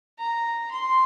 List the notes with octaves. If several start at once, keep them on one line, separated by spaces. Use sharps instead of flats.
A#5
C6